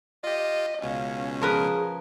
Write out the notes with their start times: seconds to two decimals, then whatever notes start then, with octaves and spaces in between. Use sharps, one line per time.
0.24 F4 G4 D#5
0.82 C#2 B2 C#4 F5
1.42 F3 G#4 A#4 B4